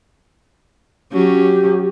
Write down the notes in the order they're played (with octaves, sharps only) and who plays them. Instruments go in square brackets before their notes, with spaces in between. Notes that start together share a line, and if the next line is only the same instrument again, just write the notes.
[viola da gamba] F#3 C#4 [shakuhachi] G4